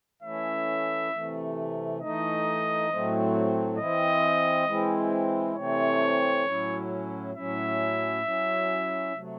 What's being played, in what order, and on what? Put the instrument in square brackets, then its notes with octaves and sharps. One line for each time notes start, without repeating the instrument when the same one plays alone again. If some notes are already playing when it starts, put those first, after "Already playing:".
[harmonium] E3 A3 C#4 E4 [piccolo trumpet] E5
[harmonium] C3 E3 A3
[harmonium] E3 A3 D#4 [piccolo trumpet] D#5
[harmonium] A2 F#3 A3 C4
[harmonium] E3 C4 E4 [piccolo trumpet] D#5
[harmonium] E3 G#3 C4 E4
[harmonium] C3 E3 A3 C4 [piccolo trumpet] C#5
[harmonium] A2 F#3 C#4 E4
[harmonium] A2 F#3 C#4 E4 [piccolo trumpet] E5
[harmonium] F#3 C#4 E4
C3 F#3 A3